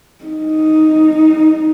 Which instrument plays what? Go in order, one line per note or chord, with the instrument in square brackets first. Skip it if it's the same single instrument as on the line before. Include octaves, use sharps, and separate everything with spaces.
[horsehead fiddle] D#4